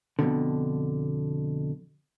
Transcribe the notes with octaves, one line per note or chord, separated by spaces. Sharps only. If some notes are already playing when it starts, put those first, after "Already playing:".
F2 G#2 B2 D3